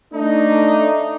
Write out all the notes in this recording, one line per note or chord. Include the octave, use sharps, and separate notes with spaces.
A3 D4 D#4